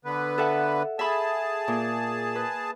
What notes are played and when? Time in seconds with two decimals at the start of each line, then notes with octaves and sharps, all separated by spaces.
0.05 D3 B3 B4
0.38 A4 E5 F#5
0.99 G#4 E5 A5 B5
1.68 A#2
2.35 B4